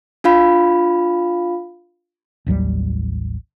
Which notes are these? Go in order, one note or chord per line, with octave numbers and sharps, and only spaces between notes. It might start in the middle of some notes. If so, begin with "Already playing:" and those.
D4 F4 F5 B5
A1 D#2 F#3 G3